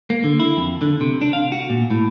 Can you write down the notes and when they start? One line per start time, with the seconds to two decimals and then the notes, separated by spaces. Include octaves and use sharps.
0.10 A#3
0.24 D3
0.40 E4
0.57 F2
0.82 D3
1.01 C3
1.21 D4
1.33 F5
1.52 F#4
1.70 A#2
1.90 A2